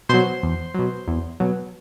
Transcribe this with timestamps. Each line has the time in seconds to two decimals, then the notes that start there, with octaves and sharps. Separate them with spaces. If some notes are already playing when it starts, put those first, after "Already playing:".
0.09 B2 F#3 C5 C6
0.43 E2
0.74 B2 F#3
1.08 E2
1.40 B2 F#3